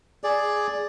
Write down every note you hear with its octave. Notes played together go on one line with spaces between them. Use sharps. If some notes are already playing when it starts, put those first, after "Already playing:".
G#4 D5